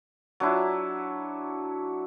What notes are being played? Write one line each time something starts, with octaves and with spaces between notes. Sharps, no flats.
F#3 D4 E4